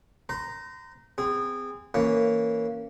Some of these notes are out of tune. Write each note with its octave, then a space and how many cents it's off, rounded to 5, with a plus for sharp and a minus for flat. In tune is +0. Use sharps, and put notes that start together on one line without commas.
C5 -40 A#5 +0
C4 -30 G#4 -25
E3 -20 A#3 -15 C#4 +0